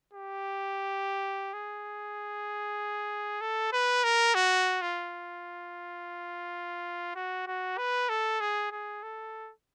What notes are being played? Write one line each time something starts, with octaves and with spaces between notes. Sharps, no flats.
G4
G#4
A4
B4
A#4
F#4
F4
F#4
F#4
B4
A4
G#4
G#4
A4